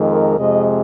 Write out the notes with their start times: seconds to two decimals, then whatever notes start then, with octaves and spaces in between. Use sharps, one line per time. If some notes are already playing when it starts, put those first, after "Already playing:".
Already playing: F2 D#3 G#3
0.10 A#4
0.37 F2 C3 G#3 D#5